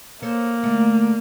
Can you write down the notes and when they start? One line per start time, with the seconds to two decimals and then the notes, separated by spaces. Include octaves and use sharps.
0.22 A#3 A4 C5 C#5
0.64 D3 A3